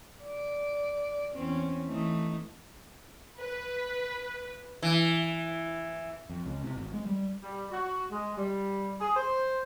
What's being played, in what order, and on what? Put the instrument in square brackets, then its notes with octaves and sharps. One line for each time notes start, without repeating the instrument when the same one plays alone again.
[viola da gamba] D5
E2 C4 C#4
E3 A3 D#4
[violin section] B4
[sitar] E3
[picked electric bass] F2
C#2
C3
G#1
G#3
G3
[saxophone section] G3
F#4
G#3
G3
G#4
C5